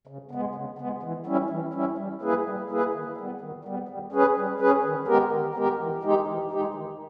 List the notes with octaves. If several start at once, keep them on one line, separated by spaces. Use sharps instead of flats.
C#3
G#3 B3
C#3
G#3 B3
E3
G3 C#4 E4
E3
G3 C#4 E4
G3
A#3 E4 G#4 B4
G3
A#3 E4 G#4 B4
D#3
G3 B3
D#3
G3 B3
G3
C#4 G#4 B4
G3
C#4 G#4 B4
D#3
G#3 B3 G4 A#4
D#3
G#3 B3 G4 A#4
E3
G#3 D#4 G4
E3
G#3 D#4 G4
D#3